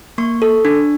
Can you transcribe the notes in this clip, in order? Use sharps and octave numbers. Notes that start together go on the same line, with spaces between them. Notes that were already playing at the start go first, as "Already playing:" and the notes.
A#3 C#6
A4
D4